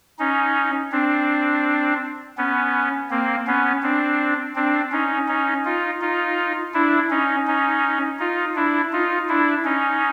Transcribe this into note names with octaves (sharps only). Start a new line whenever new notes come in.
C#4 D#4
C4 D4
B3 C#4
A#3 C4
B3 C#4
C4 D4
C4 D4
C#4 D#4
C#4 D#4
D#4 F4
D#4 F4
D4 E4
C#4 D#4
C#4 D#4
D#4 F4
D4 E4
D#4 F4
D4 E4
C#4 D#4